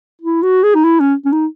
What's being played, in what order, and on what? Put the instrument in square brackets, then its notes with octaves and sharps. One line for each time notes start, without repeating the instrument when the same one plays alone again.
[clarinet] E4
F#4
G#4
D#4
E4
C#4
C#4
D#4